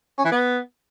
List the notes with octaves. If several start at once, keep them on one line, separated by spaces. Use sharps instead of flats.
C#4
E3
B3